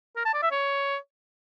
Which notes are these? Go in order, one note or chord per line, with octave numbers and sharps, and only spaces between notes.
A#4
A5
D5
E5
C#5